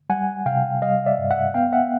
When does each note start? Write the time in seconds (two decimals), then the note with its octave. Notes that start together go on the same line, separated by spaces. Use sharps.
0.10 G3 F#5 G#5
0.46 C3 F5 G5
0.82 G3 D#5 F5
1.06 D5 E5
1.18 G2
1.31 E5 F#5
1.54 B3 F5 G5
1.73 E5 F#5